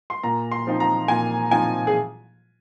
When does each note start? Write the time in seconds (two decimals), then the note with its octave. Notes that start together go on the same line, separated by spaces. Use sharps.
0.10 C6
0.23 A#2 A#5
0.51 C6
0.67 F3 C4 D#4
0.80 A#5
1.08 A#2 G#5
1.51 F3 C4 D#4 G#5
1.87 G#4